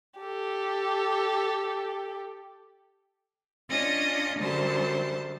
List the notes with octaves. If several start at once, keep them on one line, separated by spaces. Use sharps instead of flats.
G4 A4
C#4 D4 F4 D#5 D#6
F#2 D3 G3 C5 A5